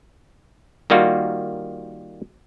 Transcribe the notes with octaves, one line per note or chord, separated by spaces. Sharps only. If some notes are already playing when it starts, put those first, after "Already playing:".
D#3 G3 A#3 F4 F#4